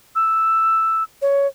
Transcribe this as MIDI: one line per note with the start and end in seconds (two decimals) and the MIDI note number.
0.15 1.03 88
1.22 1.47 73